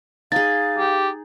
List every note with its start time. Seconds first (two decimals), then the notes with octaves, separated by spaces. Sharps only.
0.32 D#4 G#4 F5 A6
0.79 G4